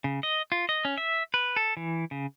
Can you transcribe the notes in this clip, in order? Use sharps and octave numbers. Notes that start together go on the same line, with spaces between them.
C#3
D#5
F4
D#5
C#4
E5
B4
A4
E3
C#3